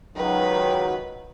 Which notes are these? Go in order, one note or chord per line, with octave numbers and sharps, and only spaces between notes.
C#2 D#3 F#3 B4